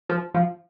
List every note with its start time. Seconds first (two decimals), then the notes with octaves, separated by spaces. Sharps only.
0.09 F3
0.34 F3